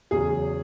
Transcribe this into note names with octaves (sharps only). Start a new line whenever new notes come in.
E2 C#3 F#3 G#4